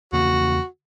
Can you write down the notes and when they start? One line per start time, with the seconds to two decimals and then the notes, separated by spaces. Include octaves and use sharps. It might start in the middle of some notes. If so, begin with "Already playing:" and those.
0.13 E2 C#3 A#3 F#4